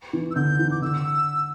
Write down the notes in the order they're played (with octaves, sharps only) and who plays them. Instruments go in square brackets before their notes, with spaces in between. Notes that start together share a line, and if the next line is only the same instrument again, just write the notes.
[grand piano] E3
[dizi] E6
[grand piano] D3 [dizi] G6
[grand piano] E3
[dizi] D6
[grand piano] D3 [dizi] E6